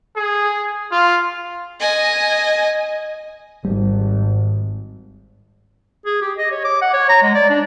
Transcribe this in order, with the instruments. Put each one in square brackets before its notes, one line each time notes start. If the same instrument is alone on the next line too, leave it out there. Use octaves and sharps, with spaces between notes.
[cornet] G#4
F4
[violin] D#5 G#5
[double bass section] G#1 [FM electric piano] G3
[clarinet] G#4
G4
D#5
C#5
D6
F#5
C#5
A#5
G#3
D5
D4